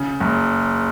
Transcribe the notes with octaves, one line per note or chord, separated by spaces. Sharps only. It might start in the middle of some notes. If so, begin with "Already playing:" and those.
Already playing: C#3
F#1